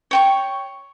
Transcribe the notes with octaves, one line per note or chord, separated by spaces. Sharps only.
C#5 G5 C#6